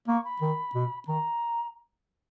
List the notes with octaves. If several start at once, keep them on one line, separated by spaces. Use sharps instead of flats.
A#3 C#6
B5
D#3
B2
D#3 A#5